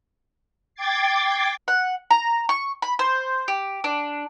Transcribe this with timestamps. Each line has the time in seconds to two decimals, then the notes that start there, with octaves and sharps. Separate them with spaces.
0.75 G5 D6 G#6 A6 C7
1.68 F#5
2.11 A#5
2.49 C#6
2.82 B5
2.99 C5
3.48 G4
3.84 D4